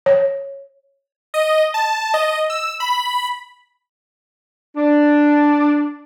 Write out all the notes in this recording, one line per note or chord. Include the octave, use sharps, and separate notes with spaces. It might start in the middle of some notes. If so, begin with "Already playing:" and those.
C#5
D#5
A5
D#5
E6
B5
D4